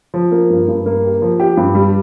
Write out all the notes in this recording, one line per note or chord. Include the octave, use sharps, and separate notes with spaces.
F3
A#3
G2
G2
A#3
G4
F3
G4
G2
G3